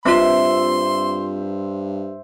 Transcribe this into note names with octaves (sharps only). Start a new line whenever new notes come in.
G2 C4 F4 C5 E5 C6